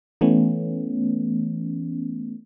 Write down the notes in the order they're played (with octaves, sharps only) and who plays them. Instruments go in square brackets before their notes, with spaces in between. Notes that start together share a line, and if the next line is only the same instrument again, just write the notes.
[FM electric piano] E3 A3 B3 C#4